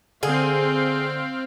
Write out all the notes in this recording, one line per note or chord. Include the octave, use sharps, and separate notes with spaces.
D3 C4 G#4 F5